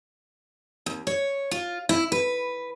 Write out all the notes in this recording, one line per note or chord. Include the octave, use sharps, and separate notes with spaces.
D#2
C#5
F4
E4
B4